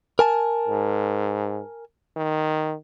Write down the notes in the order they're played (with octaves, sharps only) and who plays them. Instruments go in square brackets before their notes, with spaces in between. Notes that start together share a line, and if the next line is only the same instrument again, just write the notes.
[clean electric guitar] A#4 G#5 A5
[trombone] G#2
D#3